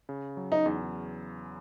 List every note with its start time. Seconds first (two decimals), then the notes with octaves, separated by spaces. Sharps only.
0.09 C#3
0.37 F#3
0.52 D#4
0.66 E2